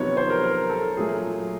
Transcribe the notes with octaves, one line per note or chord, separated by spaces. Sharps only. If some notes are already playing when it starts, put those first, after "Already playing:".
Already playing: F2 C3 D#3 F#3 B3 C#5
C5
A#4
A#4
A4
A#2 F#3 A3 G#4